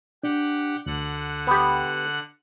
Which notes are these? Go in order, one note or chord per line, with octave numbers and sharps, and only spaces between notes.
D4 G4 F#5
D2 D3 F#5 F#6
B3 G4